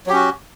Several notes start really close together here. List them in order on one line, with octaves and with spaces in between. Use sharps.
F#3 G4 C#4 F#4